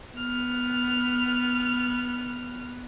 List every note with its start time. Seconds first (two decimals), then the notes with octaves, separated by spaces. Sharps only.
0.17 B3 F6